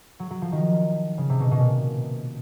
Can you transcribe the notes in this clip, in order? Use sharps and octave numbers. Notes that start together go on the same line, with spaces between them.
F#3
F#3
F3
D#3
C#3
C3
B2
B2
A#2